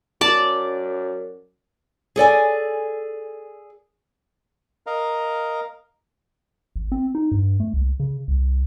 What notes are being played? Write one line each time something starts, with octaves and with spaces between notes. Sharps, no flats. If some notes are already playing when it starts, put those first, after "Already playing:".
F#2 D5 A5
G#4 A4 D5 G#5
A#4 D#5 F5 A#5
A1
C4
D#4
G2
A3
C2
C#3
C2